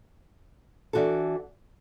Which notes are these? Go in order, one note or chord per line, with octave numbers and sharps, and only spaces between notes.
E3 D4 F#4 A4